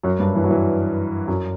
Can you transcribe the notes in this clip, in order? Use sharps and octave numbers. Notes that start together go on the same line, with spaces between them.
F#2 F#3
G2 G3
E3
F#3
E3
F#2 F#3